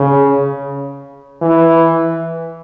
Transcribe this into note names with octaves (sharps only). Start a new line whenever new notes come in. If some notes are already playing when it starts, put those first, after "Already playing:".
Already playing: C#3
E3